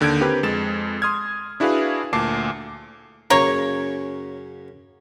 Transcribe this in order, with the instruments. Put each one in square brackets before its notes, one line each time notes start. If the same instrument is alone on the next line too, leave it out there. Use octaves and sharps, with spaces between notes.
[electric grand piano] D#2 D3 G6 G#6 D7
C4 G4 A#4 B4
F2 G#3 A6 E7
C6 D#6 F6 G#6
D4 E4 F#4 G#4 B4 F5
D2 A#2 A5 D6 C7
[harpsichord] F#2 C#3 [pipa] A#3 C#5